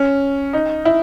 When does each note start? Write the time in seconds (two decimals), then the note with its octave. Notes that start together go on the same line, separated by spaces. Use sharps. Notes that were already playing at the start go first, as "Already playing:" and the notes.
Already playing: C#4
0.53 D#4
0.85 E4